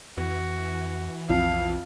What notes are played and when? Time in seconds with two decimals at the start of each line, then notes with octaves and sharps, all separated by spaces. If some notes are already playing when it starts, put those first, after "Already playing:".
0.17 F2 E3 F#4
1.29 B1 F2 F5